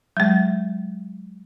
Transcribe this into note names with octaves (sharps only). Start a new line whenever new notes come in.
F#3 G#3